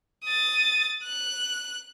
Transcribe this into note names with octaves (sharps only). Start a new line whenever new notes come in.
D#6 A6
F#6